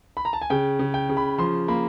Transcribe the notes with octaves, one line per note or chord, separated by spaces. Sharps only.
B5
A#5
A5
G#5
C#3 G5
C#3
G5
C#3
B5
F3 C6
A#3 B5